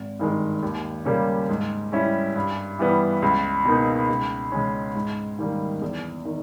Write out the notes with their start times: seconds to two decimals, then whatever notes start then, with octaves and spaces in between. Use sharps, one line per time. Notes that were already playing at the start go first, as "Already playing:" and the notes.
Already playing: G#1
0.19 G2 D#3 G#3
0.63 D#2
1.05 C#3 G3 A#3 C#4
1.49 G#2
1.92 G3 C#4 E4
2.35 G2
2.79 E3 G3 B3
3.22 C#2
3.65 B2 A#3 D#4
4.09 C#2
4.52 C#3 G#3 C#4
4.95 G#2
5.39 D#3 G3 A#3
5.82 E2
6.25 D#3